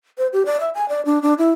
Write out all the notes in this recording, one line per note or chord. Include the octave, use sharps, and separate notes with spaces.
C5
G4
D5
E5
G#5
D5
D4
D4
E4